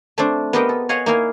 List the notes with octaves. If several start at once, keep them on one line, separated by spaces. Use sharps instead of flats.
A3 C4 D4 C5
B3 G4 A#4 C5 D#5 G5
A4
C#5 D#5 F5 F#5 G#5
A#3 D#4 E4 A#4 F5 G#5